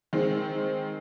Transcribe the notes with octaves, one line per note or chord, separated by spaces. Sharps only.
D#3 G#3 C4